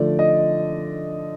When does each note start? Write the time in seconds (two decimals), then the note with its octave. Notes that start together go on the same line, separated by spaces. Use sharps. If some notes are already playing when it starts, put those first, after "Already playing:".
Already playing: D3 F3 A3 D5
0.19 D#5